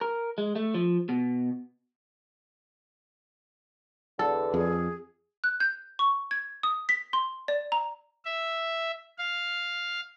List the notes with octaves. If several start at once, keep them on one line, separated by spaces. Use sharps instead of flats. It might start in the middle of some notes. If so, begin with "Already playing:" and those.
A#4
G#3
A3
F3
B2
E2 D3 A4
F2 G#4
F#6
G6
C#6
G#6
D#6
B6
C6
D5
A#5
E5
F5